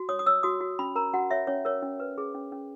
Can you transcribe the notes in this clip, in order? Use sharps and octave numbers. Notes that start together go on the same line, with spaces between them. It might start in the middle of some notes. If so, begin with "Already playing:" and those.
Already playing: F#4
C#5 D#6
D#6
C#5 E6
F#4 D#6
F#4
C#4 B5
A#4 A#5
F#4 F#5
C#5 E5
C#4 C#5
A#4 C#5
C#4
B4
G#4
C#4
C#4